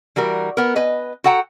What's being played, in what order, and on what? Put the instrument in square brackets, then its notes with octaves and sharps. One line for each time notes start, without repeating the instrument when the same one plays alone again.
[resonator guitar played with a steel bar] E3 G3 F#4 A#4
B3 A#4
B4 D#5 G#5
F#4 A4 F#5 G5 A5 A#5